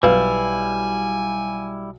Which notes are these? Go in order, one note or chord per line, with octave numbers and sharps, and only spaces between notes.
B1 G3 E4 B4 F5 G#5